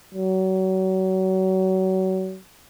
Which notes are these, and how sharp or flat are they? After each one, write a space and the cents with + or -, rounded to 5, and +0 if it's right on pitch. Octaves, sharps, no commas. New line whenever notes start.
F#3 +30